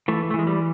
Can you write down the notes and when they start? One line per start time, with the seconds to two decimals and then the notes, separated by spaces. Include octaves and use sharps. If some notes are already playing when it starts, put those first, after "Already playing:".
0.08 E3 A3
0.30 A3
0.34 E3 G#3
0.47 G3